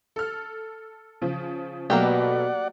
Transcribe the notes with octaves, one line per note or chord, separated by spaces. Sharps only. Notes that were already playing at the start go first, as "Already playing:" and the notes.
A4 F6
C#3 F3
B2 F#3 A3 A#3 G4 D5 F#5